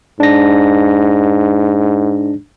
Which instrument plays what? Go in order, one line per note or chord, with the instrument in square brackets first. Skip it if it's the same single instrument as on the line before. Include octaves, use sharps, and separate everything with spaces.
[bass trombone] G#2 [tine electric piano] D4 A#6